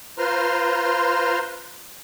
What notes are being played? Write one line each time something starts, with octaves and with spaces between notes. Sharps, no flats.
F4 B4 C5 A#5 C6 F6